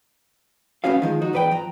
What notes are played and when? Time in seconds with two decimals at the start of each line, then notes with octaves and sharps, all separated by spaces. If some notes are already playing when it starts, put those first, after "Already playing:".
0.84 B1 A2 B3 C#4 F#4 F5
1.02 D#3 F3 G#3
1.22 D#4 F#4
1.33 E2 G#2 B4 D5 G5
1.51 F3 A#5